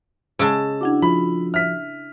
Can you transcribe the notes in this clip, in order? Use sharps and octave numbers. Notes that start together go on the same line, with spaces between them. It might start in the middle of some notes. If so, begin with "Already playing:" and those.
C#3 G#3 A5 E6
D4 E4 F#4 F#5 D6 G#6
F3 F4 F#4 B5
E5 F6 B6